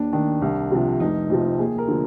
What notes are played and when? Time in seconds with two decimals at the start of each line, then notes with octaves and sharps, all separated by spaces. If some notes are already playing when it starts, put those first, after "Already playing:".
Already playing: D#2 D4
0.13 D#3 D4
0.42 C2
0.71 C3 F3
1.00 F1 D#4
1.30 F2 C3 F3
1.58 D#2 G#4
1.78 A#4
1.88 D3 F3